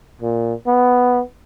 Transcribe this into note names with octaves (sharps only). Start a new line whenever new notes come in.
A#2
B3